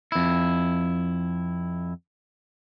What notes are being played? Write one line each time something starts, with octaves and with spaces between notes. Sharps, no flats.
F2 E4